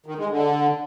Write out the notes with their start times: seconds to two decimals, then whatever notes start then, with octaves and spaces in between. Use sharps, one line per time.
0.06 D#3
0.18 G#3
0.30 D3